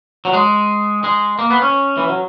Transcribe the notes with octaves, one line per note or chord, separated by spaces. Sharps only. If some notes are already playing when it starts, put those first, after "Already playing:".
F#3
G#3
G#3
A#3
B3
C#4
E3
F#3